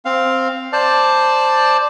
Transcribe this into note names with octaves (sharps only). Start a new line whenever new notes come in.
C4 F5
C5 D5 A5